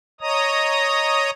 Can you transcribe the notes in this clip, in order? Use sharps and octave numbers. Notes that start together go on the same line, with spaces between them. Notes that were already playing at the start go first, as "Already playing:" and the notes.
C#5 D#5 A#5 D#6